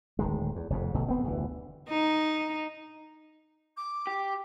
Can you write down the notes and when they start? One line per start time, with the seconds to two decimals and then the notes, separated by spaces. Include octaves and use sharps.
0.19 D1 D#3 G#3
0.56 E2
0.70 F1 F2 G#2
0.94 G1 B2 A3
1.08 D1 B3 C4
1.24 F1 D2 D3 E3
1.89 D#4
3.76 D6
4.07 G4